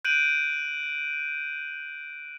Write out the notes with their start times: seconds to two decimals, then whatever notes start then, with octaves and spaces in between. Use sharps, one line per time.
0.05 F#6 G6 D7 D#7 F#7